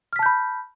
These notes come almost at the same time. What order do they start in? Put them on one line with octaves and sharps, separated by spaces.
F6 B6 A5 G6 B5